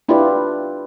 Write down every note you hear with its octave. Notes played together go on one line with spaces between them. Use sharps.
D4 E4 F4 G4 B4 D5